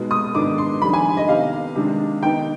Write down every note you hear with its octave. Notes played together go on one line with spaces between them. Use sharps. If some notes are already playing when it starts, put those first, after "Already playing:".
Already playing: B2 G#3 B3 D#4
D#6
G#2 D#3 G#3 B3 D4 D6
C6
F2 D#3 G3 D4 B5
G#5
D#5
C3 D#3 B3 F5
C3 D#3 G#3 D4
D#3 B3 D#4 G5